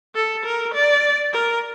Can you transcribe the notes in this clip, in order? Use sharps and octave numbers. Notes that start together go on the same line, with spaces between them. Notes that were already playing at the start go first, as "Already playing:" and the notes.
A4
A#4
D5
A#4